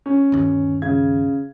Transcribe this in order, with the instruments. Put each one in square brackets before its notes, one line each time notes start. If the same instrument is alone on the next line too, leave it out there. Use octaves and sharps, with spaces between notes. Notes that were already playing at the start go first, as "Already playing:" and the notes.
[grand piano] C#4
[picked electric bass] G1 D#2
[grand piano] C#3 G#6